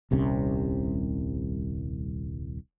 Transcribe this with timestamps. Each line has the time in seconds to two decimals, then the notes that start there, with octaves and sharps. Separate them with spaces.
0.11 D#1 C2 C3 C#4